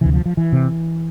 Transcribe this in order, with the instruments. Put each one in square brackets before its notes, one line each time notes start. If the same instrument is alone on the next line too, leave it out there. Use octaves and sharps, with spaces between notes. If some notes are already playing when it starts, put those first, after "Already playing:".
[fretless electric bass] D2 C3 E3
F3
F3
E3
C3